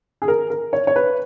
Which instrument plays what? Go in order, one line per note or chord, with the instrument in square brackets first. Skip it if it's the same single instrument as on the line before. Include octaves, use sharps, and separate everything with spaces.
[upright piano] G#4
A#4
A#4
C#5
C#5
B4